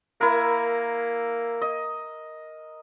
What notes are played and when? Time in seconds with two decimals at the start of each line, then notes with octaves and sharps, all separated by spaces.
0.21 A#3 E4 A#4
1.62 D#5